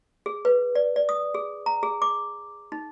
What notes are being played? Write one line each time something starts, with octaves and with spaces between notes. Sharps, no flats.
G#4
B4
D5
D5
D#6
G#4
A#5
G#4
D6
D#4